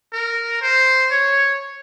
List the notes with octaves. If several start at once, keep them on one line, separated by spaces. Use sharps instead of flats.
A#4
C5
C#5